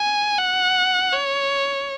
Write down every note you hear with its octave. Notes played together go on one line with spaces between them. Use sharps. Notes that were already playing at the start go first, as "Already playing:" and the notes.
Already playing: G#5
F#5
C#5